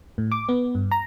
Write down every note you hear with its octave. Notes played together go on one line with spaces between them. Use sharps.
A2
D6
B3
G2
A#5